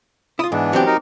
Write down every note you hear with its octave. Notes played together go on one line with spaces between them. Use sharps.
E4 F4 D#6
G#2 E3 B3 D4
F#3 C4 G4
D#4 A#4